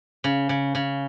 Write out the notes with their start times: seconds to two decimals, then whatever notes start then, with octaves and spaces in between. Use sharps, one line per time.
0.24 C#3
0.49 C#3
0.75 C#3